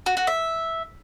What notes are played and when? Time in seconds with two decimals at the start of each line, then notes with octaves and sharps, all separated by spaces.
0.06 F#4
0.17 F#4
0.27 E5